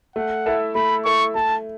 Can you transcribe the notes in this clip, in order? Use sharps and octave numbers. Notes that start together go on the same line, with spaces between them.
A3 F#5
E4 A4 E5
A3 B5
E4 A4 E5 C#6
A3 A5